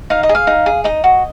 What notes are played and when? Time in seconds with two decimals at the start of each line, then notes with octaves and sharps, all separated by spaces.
0.10 D#4 F5
0.23 D#5
0.29 G#4
0.35 F5
0.47 D#4
0.66 G#4
0.84 D#4 D#5
1.04 F#4